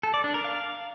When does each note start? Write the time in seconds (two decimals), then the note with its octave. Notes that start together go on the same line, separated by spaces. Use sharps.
0.03 A4
0.14 D5
0.24 D4
0.34 A#4
0.44 F5